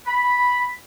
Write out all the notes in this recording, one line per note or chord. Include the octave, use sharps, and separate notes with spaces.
B5